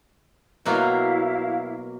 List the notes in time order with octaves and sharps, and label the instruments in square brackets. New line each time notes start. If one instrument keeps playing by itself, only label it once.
[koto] B2 F#3 A#3 [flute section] E4 F5